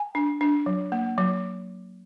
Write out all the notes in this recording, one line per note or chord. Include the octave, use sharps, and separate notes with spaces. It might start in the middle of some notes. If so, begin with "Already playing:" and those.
Already playing: G#5
D4
D4
F#3
A#3
F#3